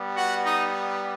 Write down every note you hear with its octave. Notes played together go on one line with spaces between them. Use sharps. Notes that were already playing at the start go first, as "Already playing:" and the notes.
Already playing: G3 B3
F#4 F#5
D#4 D#5